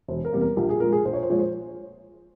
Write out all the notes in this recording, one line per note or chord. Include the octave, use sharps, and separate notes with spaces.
E1 C5
A#4
E2 C3 G3 A#3
A#4
A#1 G4
G#4
A#2 F3 G#3 A#4
G#4
A#1 C5
C#5
C5
A#2 F3 G#3 C#5
C5